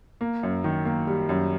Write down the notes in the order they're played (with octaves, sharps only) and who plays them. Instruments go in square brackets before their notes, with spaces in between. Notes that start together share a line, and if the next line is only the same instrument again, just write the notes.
[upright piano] A#3
F#2
D#3
A#3
G3
F#2